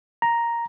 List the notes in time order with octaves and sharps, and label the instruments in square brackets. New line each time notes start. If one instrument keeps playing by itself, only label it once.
[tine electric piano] A#5